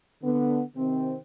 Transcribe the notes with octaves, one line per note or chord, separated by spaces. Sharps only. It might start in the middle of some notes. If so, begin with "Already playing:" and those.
D3 B3
C3 D#3 C4